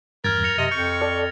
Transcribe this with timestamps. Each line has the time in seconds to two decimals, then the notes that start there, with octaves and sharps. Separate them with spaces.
0.24 E2 G2 A#4 F6 G#6 A6
0.43 F#2 A#6 C#7 F7
0.58 C3 D#5
0.71 F2 C#6 G6
1.01 A4 D5 F6